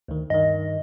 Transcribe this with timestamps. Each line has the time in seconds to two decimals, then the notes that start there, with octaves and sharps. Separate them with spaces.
0.08 D2 D#3
0.30 G2 D#3 D#5